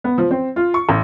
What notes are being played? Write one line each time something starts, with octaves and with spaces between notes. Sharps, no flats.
B3
F3
C4
F4
C#6
A1